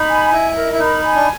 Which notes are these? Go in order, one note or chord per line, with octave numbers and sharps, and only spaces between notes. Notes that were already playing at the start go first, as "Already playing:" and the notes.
Already playing: D#4 B5
G#5
E4 D#5
A#4
E4
D#4 B5
G#5
D4